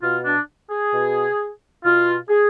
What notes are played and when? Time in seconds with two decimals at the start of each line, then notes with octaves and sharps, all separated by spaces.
0.03 B2 F4
0.25 D4
0.71 G#4
0.93 B2
1.84 B2 F4
2.29 G#4